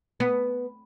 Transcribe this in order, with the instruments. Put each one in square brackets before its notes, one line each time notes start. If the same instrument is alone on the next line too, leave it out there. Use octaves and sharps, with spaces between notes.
[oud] B3